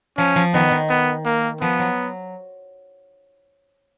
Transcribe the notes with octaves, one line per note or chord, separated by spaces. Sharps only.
F3 C#4
F3
D#3 B3
D#3
B3
A#3
F3 B3
F#3